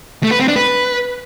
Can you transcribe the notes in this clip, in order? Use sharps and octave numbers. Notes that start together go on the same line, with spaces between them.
A3
B4
C4
D4
B4